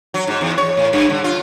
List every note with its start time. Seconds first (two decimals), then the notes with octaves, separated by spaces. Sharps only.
0.14 F#3
0.27 G#2
0.41 E2
0.58 C#5
0.77 A2
0.93 G2
1.10 D3
1.24 F4